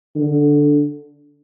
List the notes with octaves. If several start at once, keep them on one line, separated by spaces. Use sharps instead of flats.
D3